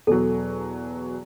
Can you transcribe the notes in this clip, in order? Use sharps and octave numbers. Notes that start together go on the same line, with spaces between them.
E2 B2 F#3 A4